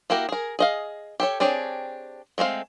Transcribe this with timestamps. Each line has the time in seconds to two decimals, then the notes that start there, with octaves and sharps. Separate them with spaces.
0.10 A#3 E4 F#4 G4 A#4
0.29 G#4 A#4
0.59 G#4 D#5 F5
1.20 G4 A4 C#5
1.40 C4 D4 G4 G#4 C#5
2.38 G#3 A3 C4 F5